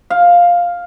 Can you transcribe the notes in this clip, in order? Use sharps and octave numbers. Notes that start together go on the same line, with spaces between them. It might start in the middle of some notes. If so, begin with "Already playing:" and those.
F5